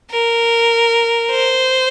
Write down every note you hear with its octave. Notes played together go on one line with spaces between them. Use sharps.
A#4
C5